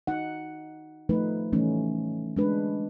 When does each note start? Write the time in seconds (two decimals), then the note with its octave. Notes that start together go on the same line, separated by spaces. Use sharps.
0.07 D#4 F#5
1.09 F3 A3 D#4 B4
1.52 E3 G3 A3 C#4 D#4
2.37 G#3 D4 B4